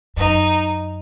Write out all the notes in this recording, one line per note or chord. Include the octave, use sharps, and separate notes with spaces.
F#2 D#4